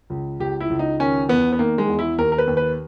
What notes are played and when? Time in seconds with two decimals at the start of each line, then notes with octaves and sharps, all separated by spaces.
0.10 C#2
0.40 C#2 G4
0.60 E4
0.70 C#2
0.79 D#4
1.00 D#3 C#4
1.28 E2 B3
1.52 B3
1.59 D#3 A#3
1.78 G#3
1.88 E2
1.99 E4
2.18 D#2 A#4
2.32 A#4
2.38 B4
2.47 D#2
2.57 B4